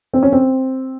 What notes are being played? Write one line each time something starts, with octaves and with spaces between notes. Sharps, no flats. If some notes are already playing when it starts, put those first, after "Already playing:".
C4
C#4
C4